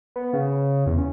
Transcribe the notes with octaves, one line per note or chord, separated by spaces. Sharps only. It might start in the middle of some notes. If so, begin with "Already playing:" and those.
B3
C#3
E2
C#4